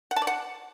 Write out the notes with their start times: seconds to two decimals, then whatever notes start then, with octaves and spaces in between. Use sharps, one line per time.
0.11 F#5
0.16 A5
0.22 D5
0.27 F#5